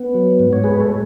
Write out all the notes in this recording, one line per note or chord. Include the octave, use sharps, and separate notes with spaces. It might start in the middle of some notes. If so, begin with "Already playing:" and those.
Already playing: B3
F#3
G#2
C#5
G#3 G#4 B4
B4
A4 C#5
A2